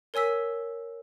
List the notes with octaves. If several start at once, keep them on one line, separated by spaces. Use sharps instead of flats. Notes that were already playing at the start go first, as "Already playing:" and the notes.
A#4 C#5 G#5 E6 B6